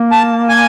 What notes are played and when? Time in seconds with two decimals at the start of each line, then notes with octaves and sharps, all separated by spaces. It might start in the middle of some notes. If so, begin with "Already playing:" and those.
Already playing: A#3
0.12 A5
0.49 G#5